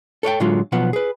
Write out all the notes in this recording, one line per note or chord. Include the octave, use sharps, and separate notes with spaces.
A4 C#5 D5 G5
A2 D3 F#3 G#3 F4
B1 B2 F3 B3 F#5
G#4 B4